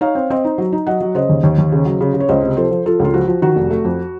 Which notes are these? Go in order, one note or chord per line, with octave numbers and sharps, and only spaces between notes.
D#4 C#5 F5
C4
C4 C5 D#5
D#4
F#3
D#4
F#3 D#5 F#5
F#3
C#3 C5 D#5
D#2
D#2
D#2
C#3
F#3
C#3
C#3
C#5
C#2 C5 D#5
C3
F3 A4 C5
F3
F3 F4 A4
C#2 F4
F3 F#4
F3
D#3 F#4
F1
A3
F2